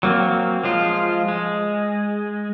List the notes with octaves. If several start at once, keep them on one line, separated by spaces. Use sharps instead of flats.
F#3 A#3 C4
F3 G#3 F4
G#3